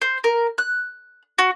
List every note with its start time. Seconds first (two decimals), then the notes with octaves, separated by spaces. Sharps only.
0.02 C5
0.24 A#4
0.58 F#6
1.38 F#4